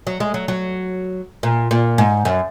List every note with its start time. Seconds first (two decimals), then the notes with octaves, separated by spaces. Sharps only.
0.07 F#3
0.20 G#3
0.34 F#3
0.48 F#3
1.43 A#2
1.71 A#2
1.98 G#2
2.25 F#2